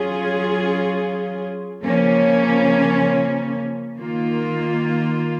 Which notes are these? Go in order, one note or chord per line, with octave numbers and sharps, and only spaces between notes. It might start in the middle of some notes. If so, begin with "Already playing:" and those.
Already playing: F#3 C#4 F4 G#4
C#3 F3 A#3 C#4
D#3 A#3 F4